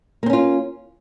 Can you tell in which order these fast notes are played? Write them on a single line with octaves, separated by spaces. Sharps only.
A#3 C4 C#4 F4